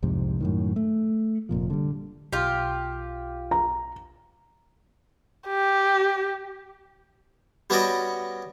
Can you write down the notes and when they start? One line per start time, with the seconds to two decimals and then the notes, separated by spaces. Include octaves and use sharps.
0.02 C2 F2 G#2 C3
0.41 F#2 A2 D#3
0.76 A3
1.49 F1 A#2 F3
1.70 D3 G3
2.33 B1 F4 G4
3.51 A#5
5.48 G4
7.70 G3 B3 C#4 F#4 D5 D#5